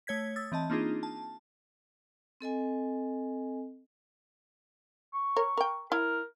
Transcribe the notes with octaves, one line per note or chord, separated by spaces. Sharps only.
A3 C#5 G#6 B6
D#6 E6 A6
E3 C4 D#5 A5
A#3 C4 D4 D#4 F4 G#4
A5
C4 A4 D#5 G#5
C#6
A#4 C#5
A#4 G5
E4 A#4 C#5